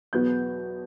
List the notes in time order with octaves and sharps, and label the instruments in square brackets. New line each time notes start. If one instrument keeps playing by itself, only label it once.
[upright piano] E2 B2 F#3 B3 G6